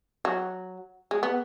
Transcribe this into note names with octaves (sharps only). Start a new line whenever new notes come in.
F#3
G#3
B3